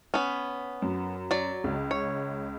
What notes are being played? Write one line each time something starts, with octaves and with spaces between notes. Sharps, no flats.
B3 C#4
F#2
F#3 D5
C#2
C#5